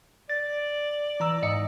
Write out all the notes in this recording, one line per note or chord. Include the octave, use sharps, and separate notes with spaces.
D5 A6
E3 A#5 E6
G#2 D#5 C#7